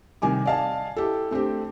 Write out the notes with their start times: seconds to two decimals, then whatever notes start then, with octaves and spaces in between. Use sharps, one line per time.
0.22 C3 D#3 G3 G#5 D6
0.45 D5 D#5 F5 G#5 A5
0.96 E4 G4 A4
1.31 A3 C4 D4 G4